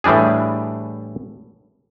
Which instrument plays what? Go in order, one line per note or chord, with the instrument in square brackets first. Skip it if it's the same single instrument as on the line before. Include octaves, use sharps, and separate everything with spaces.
[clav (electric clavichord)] A2 E3 G3 D4 G#4